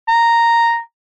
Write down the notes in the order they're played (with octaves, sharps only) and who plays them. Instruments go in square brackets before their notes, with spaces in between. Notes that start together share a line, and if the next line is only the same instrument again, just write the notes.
[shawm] A#5